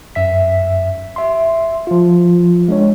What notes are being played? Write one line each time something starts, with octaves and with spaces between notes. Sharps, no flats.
F#2 E5 B6
E5 C6
F3 F4
G#3 D4 C#5